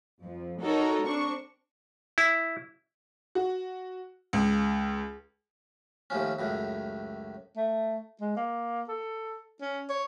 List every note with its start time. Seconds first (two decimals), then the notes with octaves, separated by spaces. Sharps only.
0.24 F2
0.62 D#4 F#4 A4 A#4 C#5
1.05 C4 D4 C#6
2.18 E4
3.35 F#4
4.33 C#2
6.10 D#2 A2 F3 C#4
6.39 C#2 F#2 A2
7.57 A3
8.20 G#3
8.36 A#3
8.89 A4
9.61 C#4
9.89 C#5